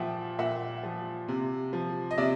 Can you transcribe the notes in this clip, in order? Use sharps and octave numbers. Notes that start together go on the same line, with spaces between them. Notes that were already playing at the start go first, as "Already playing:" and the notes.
Already playing: A#2 F3 E5 F#5 G5
A#2 E5 F#5
F3
C3
F3
D#5
C3 D5 E5